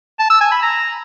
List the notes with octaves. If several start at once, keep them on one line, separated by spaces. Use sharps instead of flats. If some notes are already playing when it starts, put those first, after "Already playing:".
A5
E6
G#5
B5
A#5